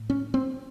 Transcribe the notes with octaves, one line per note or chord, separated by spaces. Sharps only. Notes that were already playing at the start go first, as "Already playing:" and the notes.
Already playing: A2
C#4
C4